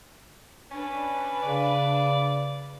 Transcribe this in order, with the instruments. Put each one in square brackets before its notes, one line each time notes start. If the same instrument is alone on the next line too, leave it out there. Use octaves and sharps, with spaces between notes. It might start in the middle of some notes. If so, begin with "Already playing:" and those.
[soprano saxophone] C#4 [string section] D4 B4
[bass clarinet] C#3 [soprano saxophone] D5